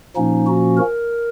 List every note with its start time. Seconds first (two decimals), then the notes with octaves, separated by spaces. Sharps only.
0.16 A#2 F3 A#3 C#4 D#4
0.47 F#4
0.77 A#4